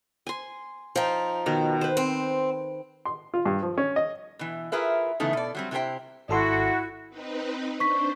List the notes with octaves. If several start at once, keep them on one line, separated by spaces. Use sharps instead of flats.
G#5 C6
F3 D#4 G5
B2 D#3
B4 C5
C4
C6
F4
G2
F3
C#4
D#5
B2 E3
F4 G#4 A#4 B4 E5
C#3 E3 A3 B3 D#4
B2 D5
F#3 G3 C4
C3 E4 G4 G#4 C5 G5
G#1 E4 F#4 A4 C6
C4 D#4 B4
D4 C5 C#6 B6